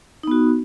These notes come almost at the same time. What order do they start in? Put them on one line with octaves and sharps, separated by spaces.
D#4 B3 F#4